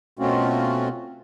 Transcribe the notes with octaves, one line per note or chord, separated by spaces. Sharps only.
B2 A3 C4 C#4 F4 F#4